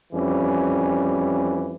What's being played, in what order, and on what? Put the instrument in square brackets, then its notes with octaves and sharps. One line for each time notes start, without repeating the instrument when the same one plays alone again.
[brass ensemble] F2 E3 G3 C#4